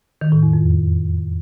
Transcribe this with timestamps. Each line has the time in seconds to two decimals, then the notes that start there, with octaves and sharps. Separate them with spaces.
0.21 D#3
0.32 A2
0.43 E2
0.53 F2